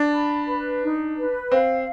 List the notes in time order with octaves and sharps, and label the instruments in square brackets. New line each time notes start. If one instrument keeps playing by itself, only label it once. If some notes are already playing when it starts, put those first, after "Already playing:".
Already playing: [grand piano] D4
[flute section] B5
B4
D#4
B4
[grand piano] C4 [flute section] F5